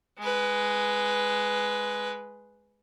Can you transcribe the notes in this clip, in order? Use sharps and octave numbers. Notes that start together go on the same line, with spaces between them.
G#3 B4